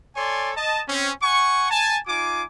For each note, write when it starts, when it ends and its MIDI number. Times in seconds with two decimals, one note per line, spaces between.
0.16 0.52 69
0.16 0.52 73
0.16 0.52 74
0.16 0.52 80
0.16 0.52 84
0.57 0.81 75
0.57 0.81 81
0.88 1.12 60
0.88 1.12 61
1.23 1.66 78
1.23 1.66 80
1.23 1.66 85
1.70 1.98 80
1.70 1.98 81
2.07 2.43 63
2.07 2.43 65
2.07 2.43 80
2.07 2.43 86